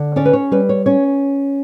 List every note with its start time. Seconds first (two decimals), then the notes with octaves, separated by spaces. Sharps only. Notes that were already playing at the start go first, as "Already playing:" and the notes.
Already playing: D3
0.16 C#4 D5
0.25 B4
0.33 C#5
0.52 G3 B4
0.69 C#5
0.86 C#4 C#5